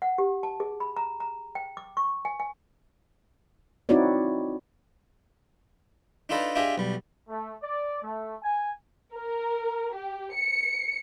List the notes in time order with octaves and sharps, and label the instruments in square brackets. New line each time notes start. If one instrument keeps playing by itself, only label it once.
[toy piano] F#5
G4
A5
G#4
B5
A#5
A#5
G5
D6
C#6
G#5
G#5
[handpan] C4 D#4 E4 F#4 C#5 D5
[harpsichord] D4 D#4 F4 A4 B4 D#5
D4 F4 G4 G#4 D#5 E5
B1 G3
[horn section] A3
D5
A3
G#5
[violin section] A#4
G4
C#7